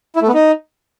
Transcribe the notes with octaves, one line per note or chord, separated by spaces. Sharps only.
E4
A3
B3
D#4